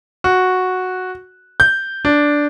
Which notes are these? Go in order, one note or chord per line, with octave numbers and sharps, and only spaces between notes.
F#4
G6
D4